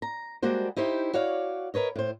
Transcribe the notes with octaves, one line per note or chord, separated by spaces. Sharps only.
A#5
G3 G#3 A#3 F#4 C5
D#4 E4 G4 C5
F#4 C#5 D5 F5
A#4 B4 C#5 D#5
A2 C5